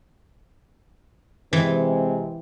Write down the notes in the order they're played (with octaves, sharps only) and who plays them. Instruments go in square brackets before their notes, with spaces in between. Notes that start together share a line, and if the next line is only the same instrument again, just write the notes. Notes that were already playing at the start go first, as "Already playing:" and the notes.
[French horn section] C3 G#3 C4 [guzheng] E3